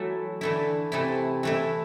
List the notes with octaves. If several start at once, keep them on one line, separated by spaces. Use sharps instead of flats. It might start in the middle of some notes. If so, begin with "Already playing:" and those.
Already playing: E3 F#3 A3 E4
D3 E3 A3 E4
C3 E3 A3 E4
E3 A3 E4